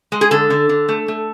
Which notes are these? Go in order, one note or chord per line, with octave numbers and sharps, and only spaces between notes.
G#3
G#4
D3 A4
D3
D3
A3
A3